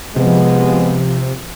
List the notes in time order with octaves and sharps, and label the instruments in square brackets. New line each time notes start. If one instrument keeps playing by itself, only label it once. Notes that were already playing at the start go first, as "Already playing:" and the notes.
[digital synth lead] C3 [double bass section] F3 [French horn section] G#3 B3